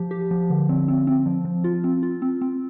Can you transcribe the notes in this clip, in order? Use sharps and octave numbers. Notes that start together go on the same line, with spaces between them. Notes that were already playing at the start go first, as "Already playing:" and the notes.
Already playing: F3 G4
G4
F3
D3
C4
C4
C4
F3
F3
F4
C4
F4
C4
C4